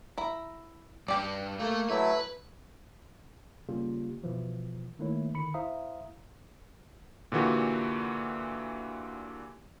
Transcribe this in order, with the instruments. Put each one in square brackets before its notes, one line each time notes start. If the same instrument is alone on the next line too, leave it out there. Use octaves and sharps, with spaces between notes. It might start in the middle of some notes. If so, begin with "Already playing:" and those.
[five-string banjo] E4 A#5
[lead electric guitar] G2 [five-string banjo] G4 D5
[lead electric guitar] A3 [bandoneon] A#3
[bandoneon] F#3 A3 E4 [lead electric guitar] B4
[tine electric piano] C#3 G3 A#3 F4 G4
B2 E3 F3
D#3 A3 A#3 E4 C#5
D3 D#3 B5 C#7
E4 C5 E5 F5 A#5 D#6
[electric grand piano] A#2 D3 E3 F#4 G4